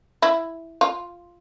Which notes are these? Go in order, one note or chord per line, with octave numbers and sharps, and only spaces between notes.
E4
F4